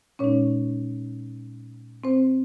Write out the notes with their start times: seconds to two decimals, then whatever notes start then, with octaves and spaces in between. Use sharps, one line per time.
0.19 A#2 G#3 C#4 D#4 C#5
2.04 C4 C5